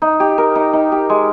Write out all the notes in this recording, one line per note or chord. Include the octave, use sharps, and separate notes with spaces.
D#4
G4
A#4
D#4
D#4
G4
G#3